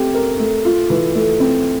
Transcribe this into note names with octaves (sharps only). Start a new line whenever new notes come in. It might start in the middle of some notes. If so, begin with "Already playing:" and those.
Already playing: A3 C4 G4
A#4
A3
F4
E3
A3
C4